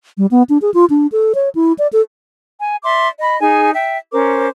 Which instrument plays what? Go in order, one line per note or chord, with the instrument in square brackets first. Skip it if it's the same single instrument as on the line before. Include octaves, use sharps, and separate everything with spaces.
[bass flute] G3
B3
D4
G#4
F4
D4
A4
C#5
E4
D5
A4
[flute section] G#5
D5 E5 C6 D6
D#5 B5
D#4 G#4 G#5
E5 G5
C#4 A#4 C5 D6